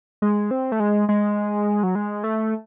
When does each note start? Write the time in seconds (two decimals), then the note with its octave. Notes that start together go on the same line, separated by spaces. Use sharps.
0.22 G#3
0.51 C4
0.72 A3
0.80 G#3
1.09 G#3
1.83 F#3
1.95 G#3
2.24 A3